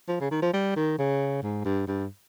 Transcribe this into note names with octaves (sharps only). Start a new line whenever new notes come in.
F3
C#3
D#3
F3
G3
D#3
C#3
G#2
G2
G2